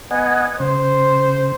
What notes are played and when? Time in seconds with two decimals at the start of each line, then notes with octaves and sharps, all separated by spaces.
0.11 B3 D#5 F#5 G#5
0.60 C#3 C5